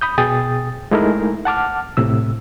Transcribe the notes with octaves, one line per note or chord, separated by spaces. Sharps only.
B5 D#6 G6
B2 G#4 G5 D#6 A6
G#3 A3 D#4 E4 G#4 A#4
F#5 A5 D6 F6
A2 C3 E6